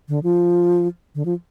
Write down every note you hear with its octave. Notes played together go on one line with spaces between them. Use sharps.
D3
F3
D3
F3